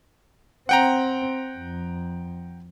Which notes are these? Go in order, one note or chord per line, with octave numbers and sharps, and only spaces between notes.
C4 F#5 G5 A#5
F2